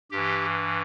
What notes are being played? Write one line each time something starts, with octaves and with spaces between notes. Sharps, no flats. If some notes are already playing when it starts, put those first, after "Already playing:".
G2 E3 G4